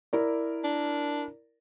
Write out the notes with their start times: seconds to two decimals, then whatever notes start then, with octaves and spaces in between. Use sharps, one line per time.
0.13 E4 A#4 D5
0.64 D4